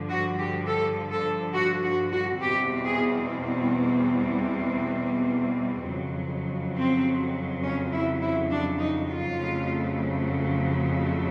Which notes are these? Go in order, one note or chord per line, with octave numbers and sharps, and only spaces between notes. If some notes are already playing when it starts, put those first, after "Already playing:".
Already playing: G2 D3 F3
F#4
G4
A4
A4
F#4
F#4
F#4
E2 B2 G3 C4 G4
G#4
F2 C#3 F#3
C4
C#4
E4
E4
D4
D#4
F4
F2 C#3 F#3 A3